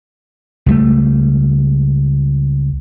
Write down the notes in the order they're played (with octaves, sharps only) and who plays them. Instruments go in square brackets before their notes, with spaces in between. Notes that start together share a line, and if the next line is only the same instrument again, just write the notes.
[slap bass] C#2 G3 A3